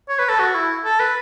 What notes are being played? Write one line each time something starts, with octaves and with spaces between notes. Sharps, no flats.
C#5
B4
A4
F#4
E4
A4
B4